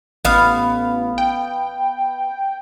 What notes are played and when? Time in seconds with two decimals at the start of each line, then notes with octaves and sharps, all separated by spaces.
0.25 A1 B3 F5
1.18 G5